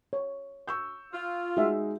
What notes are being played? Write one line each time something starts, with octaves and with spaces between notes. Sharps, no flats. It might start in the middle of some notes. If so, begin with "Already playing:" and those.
C#5
C#6 E6 G6
F4
G#3 D#4 F#4 E5